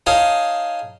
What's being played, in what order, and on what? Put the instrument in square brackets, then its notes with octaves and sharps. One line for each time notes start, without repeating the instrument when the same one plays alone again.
[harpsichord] D#4 G#4 C#5 F5 A5